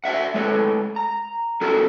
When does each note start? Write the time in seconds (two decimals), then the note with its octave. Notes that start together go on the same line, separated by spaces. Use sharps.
0.04 F#4 D5 E5 F#5
0.34 G#3 A3 A4 B4 C#5
0.96 A#5
1.61 B3 D4 F4 F#4 A4 A#4